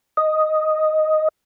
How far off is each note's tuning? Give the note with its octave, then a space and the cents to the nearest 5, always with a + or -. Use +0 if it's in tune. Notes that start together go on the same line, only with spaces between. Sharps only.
D#5 +0